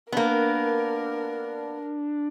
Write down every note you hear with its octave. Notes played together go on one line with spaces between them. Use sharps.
A#3 B3 D4 A#4